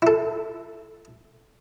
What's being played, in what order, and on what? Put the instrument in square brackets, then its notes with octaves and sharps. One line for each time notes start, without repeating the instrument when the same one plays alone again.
[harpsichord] E4 A4